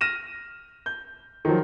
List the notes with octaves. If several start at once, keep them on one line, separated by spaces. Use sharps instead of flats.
F6 A#6 D#7 E7
G6
D#3 F3 F#3